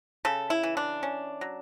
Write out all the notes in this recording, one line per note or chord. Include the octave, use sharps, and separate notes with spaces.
C#3 A4
E4
E3
D4
C#4
F#3